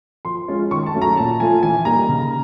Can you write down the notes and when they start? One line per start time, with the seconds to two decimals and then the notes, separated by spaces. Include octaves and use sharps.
0.25 F3 C6
0.48 G#3 C#4 F4
0.71 D#3 C#6
0.86 A5
0.94 F#3 A3 C#4
1.02 A#5
1.17 A#2 A5
1.40 F3 A3 C#4 F4 G#5
1.63 E3 G#5
1.85 G3 A#3 D#4 A#5
2.09 C#3